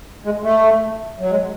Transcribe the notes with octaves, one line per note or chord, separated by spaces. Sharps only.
G#3
A3
F#3
G#3